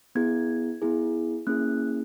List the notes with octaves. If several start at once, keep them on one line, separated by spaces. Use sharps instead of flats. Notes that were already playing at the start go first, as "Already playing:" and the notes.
B3 E4 G#4 G#6
B3 E4 G#4
A#3 C#4 E4 G#4 F#6